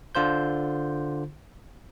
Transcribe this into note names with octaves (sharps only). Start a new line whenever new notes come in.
D3 F4 C5 G6